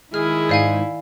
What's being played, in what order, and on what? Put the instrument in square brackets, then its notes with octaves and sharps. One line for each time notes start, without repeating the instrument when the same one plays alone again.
[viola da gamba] D#3 E4 [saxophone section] G#3 G#4 [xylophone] F6
[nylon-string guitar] G#2 [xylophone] D5 F5 G#5